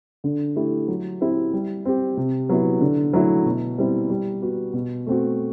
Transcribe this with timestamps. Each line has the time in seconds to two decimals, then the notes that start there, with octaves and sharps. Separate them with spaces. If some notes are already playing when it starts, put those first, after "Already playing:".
0.24 D3
0.56 A3 E4 G4
0.88 F#3
1.21 C4 E4 G4
1.53 G3
1.85 C4 G4
2.17 C3
2.49 F#3 B3 E4
2.81 D3
3.13 F#3 A3 E4
3.46 B2
3.78 G3 C4 E4
4.10 G3
4.42 B3 F#4
4.73 B2
5.07 A3 C4 F#4